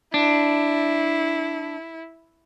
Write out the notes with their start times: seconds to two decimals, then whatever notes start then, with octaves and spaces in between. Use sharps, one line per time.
0.14 D4 E4